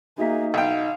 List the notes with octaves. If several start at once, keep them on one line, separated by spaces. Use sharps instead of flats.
A#3 D#4 F#4 G#4 E5 B6
B1 F5 G5